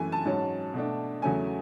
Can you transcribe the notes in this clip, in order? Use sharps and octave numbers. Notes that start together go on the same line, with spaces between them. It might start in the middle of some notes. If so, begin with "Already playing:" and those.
Already playing: F#2 E3 A3 G#5
A5
G#2 F#3 C#4
B2 A3 D4
E2 C#3 F#3 A3 C#4 G#5